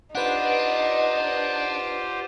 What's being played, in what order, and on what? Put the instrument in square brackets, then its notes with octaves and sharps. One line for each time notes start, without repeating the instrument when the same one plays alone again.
[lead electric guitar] D4 [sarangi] D#4 [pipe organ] F4 G4 C5 [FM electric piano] B4 F#5